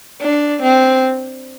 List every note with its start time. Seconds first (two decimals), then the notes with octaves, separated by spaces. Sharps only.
0.21 D4
0.63 C4